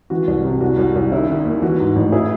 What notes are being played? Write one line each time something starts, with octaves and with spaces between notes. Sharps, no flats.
E3 F#4
C2
C3
C2 F#4
C2
C2
D#3 E4
D#3
D#2
E3 F#4
G#2
A1
E4 G#4